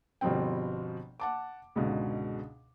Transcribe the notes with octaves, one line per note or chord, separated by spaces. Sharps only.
G1 B2 F3 G3 C4 G5
F#5 A5 D6
C#2 G#2 B2 D3